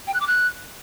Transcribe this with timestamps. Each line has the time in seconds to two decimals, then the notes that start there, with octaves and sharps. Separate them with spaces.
0.07 G5
0.14 F#6
0.21 D6
0.27 F#6